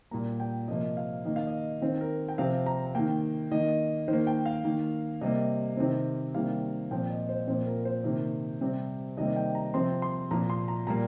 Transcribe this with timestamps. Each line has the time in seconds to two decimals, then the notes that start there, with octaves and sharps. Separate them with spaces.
0.11 A#2 G3 A#3 A#5
0.40 G5
0.68 C3 F3 A#3 D#5
0.97 F5
1.25 D#3 A#3 D#5
1.36 F5
1.47 D#5
1.82 D#3 C4
2.01 A#4
2.29 G5
2.38 C3 F3 C4 F5
2.66 A#5
2.95 D#3 A#3 G5
3.51 D#3 A#3 D#5
4.08 D#3 C5
4.13 A#3
4.27 G5
4.46 F5
4.64 D#3 A#3
5.21 C3 G3 A#3 D#5
5.77 C3 D#3 C4
6.34 C3 D#3 G3 A#3 F5
6.91 A#2 F3 C4 G5
7.10 D#5
7.29 C5
7.48 A#2 F3 C4 C5
7.66 A#4
7.85 C5
8.04 C3 D#3 A#3
8.61 C3 G3 C4
9.17 C3 D#3 G3 A#3 D#5
9.36 G5
9.55 A#5
9.74 C3 F3 C4 C6
10.02 C6
10.31 A#2 F3 A#3 A#5
10.50 C6
10.68 A#5
10.87 A#2 G3 A#3 A#5